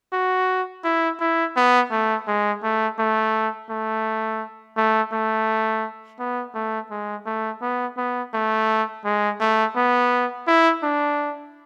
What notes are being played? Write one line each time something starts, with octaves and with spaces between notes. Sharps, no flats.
F#4
E4
E4
B3
A3
G#3
A3
A3
A3
A3
A3
B3
A3
G#3
A3
B3
B3
A3
G#3
A3
B3
E4
D4